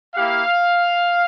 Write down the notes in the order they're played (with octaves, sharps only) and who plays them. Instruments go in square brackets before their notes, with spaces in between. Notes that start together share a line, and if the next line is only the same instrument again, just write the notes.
[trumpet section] A#3 E4 G4 F5